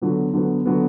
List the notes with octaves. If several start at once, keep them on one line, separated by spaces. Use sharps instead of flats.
D3 F#3 B3
D3 F#3 B3
D3 F#3 B3